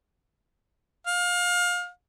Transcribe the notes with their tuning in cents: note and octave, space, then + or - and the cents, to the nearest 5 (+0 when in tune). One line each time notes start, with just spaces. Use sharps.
F5 +30